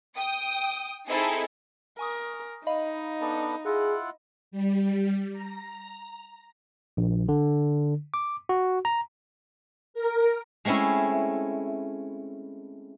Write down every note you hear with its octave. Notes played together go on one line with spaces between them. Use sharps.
G5 D#6
C4 D#4 E4 G#4 A4
A#4 G#5 C#6 D#6
D#4 D#5 F5 B5
B3 D4 A4
E4 F4 G#4 F#5
G3
A#5
A#1
D3
D6
F#4
A#5
A#4
G#3 A3 C4 C#4 E4